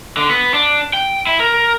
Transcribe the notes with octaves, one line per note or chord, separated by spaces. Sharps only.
D3
B3
D4
G5
E4
A#4